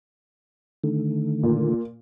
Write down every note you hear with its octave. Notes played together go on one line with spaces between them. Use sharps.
D3 D#3 A3
A#2